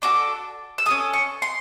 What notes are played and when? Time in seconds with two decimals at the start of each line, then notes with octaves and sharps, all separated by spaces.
0.02 D4 F#4 A4 D6
0.78 E6
0.86 C#4 F4 A4 D#6
1.13 C#6
1.42 C6